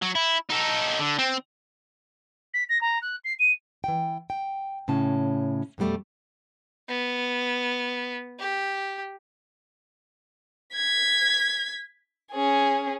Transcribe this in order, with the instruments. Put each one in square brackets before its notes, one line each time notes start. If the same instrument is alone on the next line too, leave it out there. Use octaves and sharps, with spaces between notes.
[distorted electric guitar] F#3
E4
D#4 A4
D3
C4
[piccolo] B6
A#6
A#5
F#6
C7
D#7
[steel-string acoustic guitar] E3 G5
G5
A2 C#3 C#4 A5
F2 B2 E3 G3 A3
[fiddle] B3
G4
[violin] G#6 B6
C#4 G#4